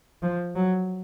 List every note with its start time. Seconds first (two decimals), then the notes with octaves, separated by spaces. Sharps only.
0.22 F3
0.55 F#3